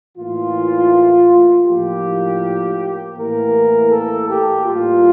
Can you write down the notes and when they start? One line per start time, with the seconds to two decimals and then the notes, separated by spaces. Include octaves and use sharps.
0.17 A2 E3 A#3 F4
1.67 A2 F3 A#3 G4
3.16 A2 E3 A#3 A#4
3.91 A4
4.28 G4
4.66 A2 G3 A#3 F4